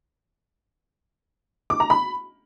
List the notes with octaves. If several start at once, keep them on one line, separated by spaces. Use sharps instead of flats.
D6
A#5
B5